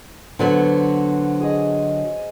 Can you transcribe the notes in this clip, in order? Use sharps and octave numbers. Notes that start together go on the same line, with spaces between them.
D3 F#3 B3 C5
G#4 D#5